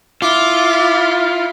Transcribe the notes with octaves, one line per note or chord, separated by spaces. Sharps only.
E4 F4 D6